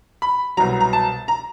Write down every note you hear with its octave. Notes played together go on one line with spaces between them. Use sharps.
B5
C2 B2 F#3 A#5
A#5
A5
A#5